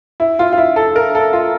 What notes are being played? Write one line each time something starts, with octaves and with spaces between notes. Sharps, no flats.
E4
F4
F4
E4
A4
A#4
A4
F4